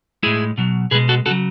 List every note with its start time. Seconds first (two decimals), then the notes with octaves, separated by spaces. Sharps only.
0.23 A2 G#3 E4 G#4
0.58 B2 F#3
0.91 B2 G#4 B4
0.95 G#3
1.09 F#4 A4
1.26 C#3 F#3 F#4 A4